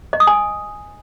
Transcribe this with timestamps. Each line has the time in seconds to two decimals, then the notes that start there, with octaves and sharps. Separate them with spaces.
0.13 D#5
0.20 D#6
0.27 G#5